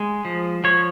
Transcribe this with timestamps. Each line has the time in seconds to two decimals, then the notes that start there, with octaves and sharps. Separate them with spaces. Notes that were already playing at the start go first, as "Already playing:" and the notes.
Already playing: G#3
0.25 F3
0.64 F3 C#5